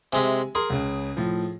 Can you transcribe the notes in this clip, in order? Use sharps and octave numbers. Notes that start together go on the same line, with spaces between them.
C3 G#3 E5 G#5
G#4 A#4 C6
C#2 C#3
A2 F3